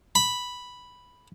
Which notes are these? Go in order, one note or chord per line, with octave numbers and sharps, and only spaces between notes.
B5